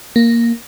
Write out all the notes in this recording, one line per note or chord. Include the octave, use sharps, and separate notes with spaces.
A#3